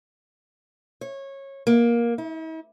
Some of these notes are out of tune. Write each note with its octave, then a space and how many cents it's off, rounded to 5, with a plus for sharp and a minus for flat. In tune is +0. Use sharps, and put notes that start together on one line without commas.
C#5 -20
A#3 +15
E4 -45